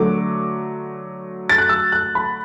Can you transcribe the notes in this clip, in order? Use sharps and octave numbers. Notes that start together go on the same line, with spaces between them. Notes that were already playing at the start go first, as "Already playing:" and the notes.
Already playing: D3 F#3 A3 D6
A6
F#6
E6
F#6
B5